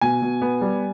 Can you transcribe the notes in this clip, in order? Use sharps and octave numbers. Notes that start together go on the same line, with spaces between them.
B2 G#5
B2
B3
G3